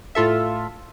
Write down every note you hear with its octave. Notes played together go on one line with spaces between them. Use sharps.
A2 F4 A4 E5